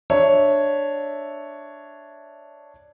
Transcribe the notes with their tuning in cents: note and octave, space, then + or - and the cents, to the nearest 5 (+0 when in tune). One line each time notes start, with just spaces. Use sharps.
D4 +0 C#5 +0 E5 -5